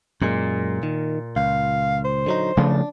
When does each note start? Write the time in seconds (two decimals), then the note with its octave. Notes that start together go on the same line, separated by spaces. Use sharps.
0.22 F#2 A#2 G#3
0.83 D#3
1.36 C#2 F5
2.05 C5
2.26 D3 F#3 D#4
2.57 C#3 F3 A3 D4